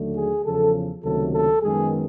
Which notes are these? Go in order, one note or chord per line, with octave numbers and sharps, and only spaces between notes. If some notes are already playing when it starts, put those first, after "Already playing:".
Already playing: D#2 D3 F#3 A3
G#4
E2 C#3 F3 A4
C#2 C3 D#3 F#3 A3 A4
A4
F#2 D#3 G#3 B3 G#4